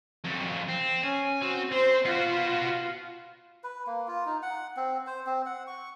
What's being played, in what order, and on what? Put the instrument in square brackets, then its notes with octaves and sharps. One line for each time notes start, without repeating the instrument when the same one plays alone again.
[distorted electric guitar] F2 F#3
C4
[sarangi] C#4 [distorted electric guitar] G#5
[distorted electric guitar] C4 [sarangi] F#4
[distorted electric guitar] C4 [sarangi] C5
[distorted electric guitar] B3 F#4 [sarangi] F4
[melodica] B4
A#3
F4
D#4
F#5
C4
C5
C4
F#5
C#6